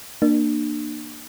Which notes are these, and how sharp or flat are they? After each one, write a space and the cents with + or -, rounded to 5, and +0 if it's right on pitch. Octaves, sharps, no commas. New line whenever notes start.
A#3 +0 D4 +35